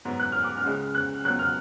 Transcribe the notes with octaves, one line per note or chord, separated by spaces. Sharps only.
G#2 F#3 B3
F#6
F6
D6
F6
C#2 C#3 G#3 C#4
F#6
C#2 B2 F#3 F#6
F6